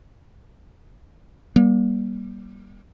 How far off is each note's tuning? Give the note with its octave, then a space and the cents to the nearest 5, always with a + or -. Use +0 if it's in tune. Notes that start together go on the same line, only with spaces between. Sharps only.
G3 -5 A#3 +40